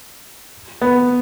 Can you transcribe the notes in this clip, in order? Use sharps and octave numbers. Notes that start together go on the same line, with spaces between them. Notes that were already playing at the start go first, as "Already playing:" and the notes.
B3